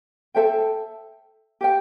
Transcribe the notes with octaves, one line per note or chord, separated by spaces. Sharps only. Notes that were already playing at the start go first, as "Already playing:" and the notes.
A4 C5 E5 G5
G4 C5 G5